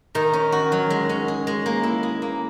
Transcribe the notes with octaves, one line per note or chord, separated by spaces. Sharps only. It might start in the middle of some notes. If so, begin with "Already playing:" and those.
D#3 A#4
C#4
F#4
F#3
G#3
C#4
G#4
G#3
A#3
E4
G#4
A#3